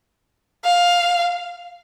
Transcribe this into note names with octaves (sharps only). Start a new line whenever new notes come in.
F5